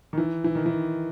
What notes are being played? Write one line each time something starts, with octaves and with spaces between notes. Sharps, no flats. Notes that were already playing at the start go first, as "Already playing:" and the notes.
D#3
E3
E3
D#3
E3